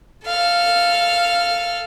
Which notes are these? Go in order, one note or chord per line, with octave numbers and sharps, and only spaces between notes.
A4 F5